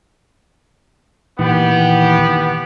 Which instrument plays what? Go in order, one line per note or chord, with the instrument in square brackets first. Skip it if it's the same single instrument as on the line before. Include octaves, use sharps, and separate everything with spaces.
[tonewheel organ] A#2 D#3 E3 [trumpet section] B3 G4